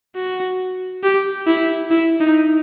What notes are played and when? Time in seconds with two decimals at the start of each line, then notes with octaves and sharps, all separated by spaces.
0.16 F#4
1.03 G4
1.47 E4
1.91 E4
2.20 D#4